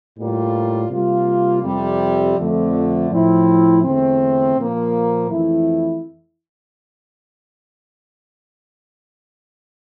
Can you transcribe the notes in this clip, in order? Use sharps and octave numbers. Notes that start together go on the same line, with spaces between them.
A2 G3 A#3 F4
C3 G3 A#3 F4
F2 C3 G3
F2 D3 A3
A2 F3 C4 E4
E2 D3 A3 C4
A#2 F3 A#3
F2 E3 A3 E4